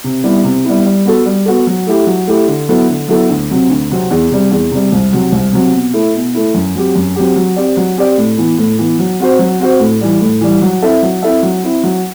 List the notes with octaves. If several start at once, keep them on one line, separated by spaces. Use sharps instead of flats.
C3
G3 B3 E4
C3
G3 B3 E4
G3
B3 F#4 A4
G3
B3 F#4 A4
F#3
A3 E4 G4
F#3
A3 E4 G4
D3
F#3 B3 E4 A4
D3
F#3 B3 E4 A4
D2
C3 F#3 C4
D2
C3 F#3 C4
E2
C3 G3
E2
C3 G3
C2
C3 F#3 C4
C2
C3 F#3 C4
B2
A3 E4
B2
A3 E4
F#2
F#3 C4 G4
F#2
F#3 C4 G4
F#3
C4 G4 D5
F#3
C4 G4 D5
A2
E3 B3
A2
E3 B3
F#3
C4 F#4 C5
F#3
C4 F#4 C5
A2
E3 G3
A2
E3 G3
F#3
C4 E4 A4 E5
F#3
C4 E4 A4 E5
F#3
C4 E4
F#3